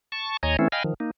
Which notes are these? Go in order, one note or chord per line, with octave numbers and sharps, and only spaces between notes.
A5 C#6
D#2 C#5 D#5 G#5 A#5
E3 A3 C4 C#4 E4
D#5 F5 G5 G#5 B5 F6
D#3 F3
A#3 D#4